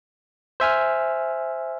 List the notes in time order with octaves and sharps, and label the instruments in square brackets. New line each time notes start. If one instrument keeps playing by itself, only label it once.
[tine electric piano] C5 E5 G#5 F6